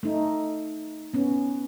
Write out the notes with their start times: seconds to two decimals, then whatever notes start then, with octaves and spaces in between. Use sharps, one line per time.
0.03 A3 D#4
1.14 B3 C#4